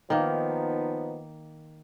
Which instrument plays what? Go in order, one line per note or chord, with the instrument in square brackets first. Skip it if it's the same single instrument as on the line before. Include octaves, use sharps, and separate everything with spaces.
[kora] D#3 A#3 [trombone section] F3 B3 D#4